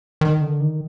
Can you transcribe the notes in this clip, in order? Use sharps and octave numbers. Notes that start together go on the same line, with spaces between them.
D#3
D3
D#3